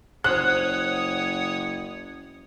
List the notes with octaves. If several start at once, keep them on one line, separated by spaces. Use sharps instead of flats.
F#1 C5 C#5 F#5 D#6 F#6